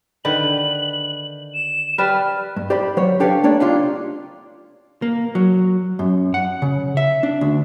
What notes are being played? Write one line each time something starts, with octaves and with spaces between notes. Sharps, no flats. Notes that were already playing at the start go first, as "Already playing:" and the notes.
D3 D#3 B4 F#7
E7
G3 B4 F6
G2
G4 C5 D5 B5
F#3 C5 C#5
D4 G4 A4 B4 C#5 F5
A3 A#3 D4 C#5 D5
D4 D#4 F4 G4
A#3
F#3
F#2
F#5
C#3
E5
D4
D2